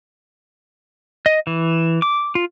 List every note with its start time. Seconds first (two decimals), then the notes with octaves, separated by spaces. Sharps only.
1.26 D#5
1.47 E3
2.02 D6
2.35 F4